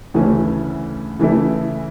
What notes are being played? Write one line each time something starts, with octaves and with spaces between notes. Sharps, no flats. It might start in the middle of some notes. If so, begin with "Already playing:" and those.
D2 C#3 E3 A3 C#4
C#3 E3 A3 E4